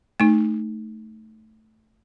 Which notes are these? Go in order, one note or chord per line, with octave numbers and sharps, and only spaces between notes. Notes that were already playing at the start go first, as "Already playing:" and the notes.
A3 D#4